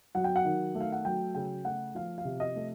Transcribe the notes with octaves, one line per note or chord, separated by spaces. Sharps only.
F#3 F#5
G5
F#5
D#3
A3
F5
F#5
F#3 G5
C#3 G5
A3 F#5
F3 F5
F5
C3
D#5
A3